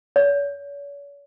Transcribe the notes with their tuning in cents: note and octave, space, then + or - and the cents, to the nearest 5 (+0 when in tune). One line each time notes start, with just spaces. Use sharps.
C#5 +40